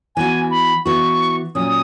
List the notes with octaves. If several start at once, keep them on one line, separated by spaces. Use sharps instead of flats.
E3 B3 F#4 G#5
B5
E3 B3 F#4 C#6
A#2 F#3 C#4 D#6